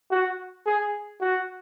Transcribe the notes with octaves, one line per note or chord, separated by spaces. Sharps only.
F#4
G#4
F#4